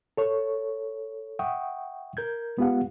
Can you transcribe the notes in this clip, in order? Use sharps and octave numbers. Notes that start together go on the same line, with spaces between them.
A4 C#5 C#6
E5 F#5 G5 C#6 D#6
A#4 G6 G#6
G#3 B3 F4 G4 F5 F#5